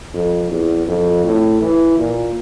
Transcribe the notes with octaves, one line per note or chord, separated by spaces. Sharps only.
F2
E2
F2
A2
E3
A#2